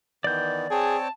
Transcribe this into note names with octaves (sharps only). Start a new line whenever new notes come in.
D#3 E3 B3 D5 G6
C4 G#4 C#5 G5 A5